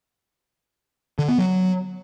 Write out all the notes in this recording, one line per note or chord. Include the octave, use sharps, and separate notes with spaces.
D3
B3
F#3